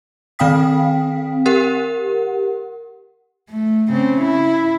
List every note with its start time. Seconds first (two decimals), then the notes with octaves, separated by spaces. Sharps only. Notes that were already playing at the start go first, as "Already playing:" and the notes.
0.39 D#3 C4 F5 G5 D#6 B6
1.46 G4 A#4 F#5
3.49 A3
3.89 C#3 C4
4.22 E4